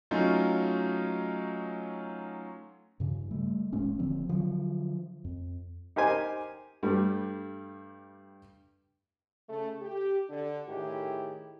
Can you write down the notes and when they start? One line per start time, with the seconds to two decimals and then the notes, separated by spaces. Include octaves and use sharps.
0.11 F#3 A3 C#4 D#4 F4
3.00 G2 C#3
3.31 G3 A3
3.73 D#1 A2 G#3 C#4
3.99 D#1 D3 F3 C4
4.29 D3 F3 F#3
5.25 F2
5.96 D#4 G4 A#4 C5 G#5
6.83 G2 G3 A3
9.49 C#3 A3
9.81 G4
10.30 D3
10.69 A2 D#3 E4 G4 G#4